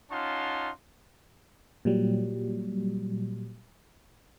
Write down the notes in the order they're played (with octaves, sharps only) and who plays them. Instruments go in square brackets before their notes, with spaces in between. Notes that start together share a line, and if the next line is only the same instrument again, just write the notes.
[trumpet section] C#4 D#4 F4 F#5 A5 C6
[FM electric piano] A#2 F#3 G3